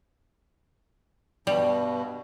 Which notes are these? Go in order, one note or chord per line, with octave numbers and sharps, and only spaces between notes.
G2 B2 G3